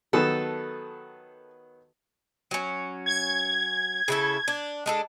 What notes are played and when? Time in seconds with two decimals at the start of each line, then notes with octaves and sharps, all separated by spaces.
0.13 D#3 F#3 B3 A4
2.51 F#3 C#4
3.06 G#6
4.08 C#3 E4 A4
4.48 D4
4.86 G#3 D4 A4